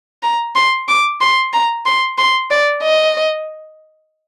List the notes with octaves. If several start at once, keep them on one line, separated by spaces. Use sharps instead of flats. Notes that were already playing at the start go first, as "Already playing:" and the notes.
A#5
C6
D6
C6
A#5
C6
C6
D5
D#5